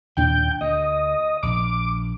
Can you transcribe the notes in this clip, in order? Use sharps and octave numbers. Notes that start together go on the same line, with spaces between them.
D#2 A#2 D4 G5
D2 D#5
A#1 D6